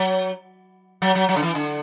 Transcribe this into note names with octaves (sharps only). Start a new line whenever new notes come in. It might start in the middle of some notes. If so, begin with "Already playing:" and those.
Already playing: F#3
F#3
F#3
F#3
D3
E3
D3